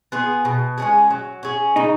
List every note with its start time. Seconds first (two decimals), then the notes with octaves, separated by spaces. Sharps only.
0.12 B3 F4 G#4
0.45 B2
0.78 G#3 C#4 G#4
1.10 F#3
1.43 C#4 G#4
1.76 C#3 D#4